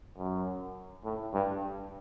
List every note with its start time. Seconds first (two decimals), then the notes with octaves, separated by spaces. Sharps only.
0.18 F#2
1.04 A2
1.33 G2